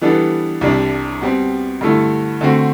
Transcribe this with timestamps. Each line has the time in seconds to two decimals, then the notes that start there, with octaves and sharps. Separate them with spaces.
0.01 E3 G3 B3 D4 A4
0.61 C2 C3 G3 D4
1.21 B2 G3 C4
1.81 G2 D3 A3 E4 A4
2.41 D3 A3 C4 F#4